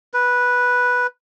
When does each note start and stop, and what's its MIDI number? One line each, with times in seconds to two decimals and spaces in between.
0.14 1.07 71